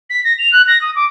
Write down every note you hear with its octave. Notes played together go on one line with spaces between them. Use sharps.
B6
A#6
F7
F#6
A#6
D#6
D6